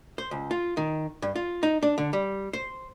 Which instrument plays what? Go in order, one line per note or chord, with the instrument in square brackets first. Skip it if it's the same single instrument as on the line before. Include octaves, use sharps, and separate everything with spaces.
[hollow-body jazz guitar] C5
C#2
F4
D#3
G2
F4
D#4
D4
D3
G3
C5